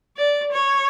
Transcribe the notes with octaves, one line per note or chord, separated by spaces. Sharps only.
D5
C#5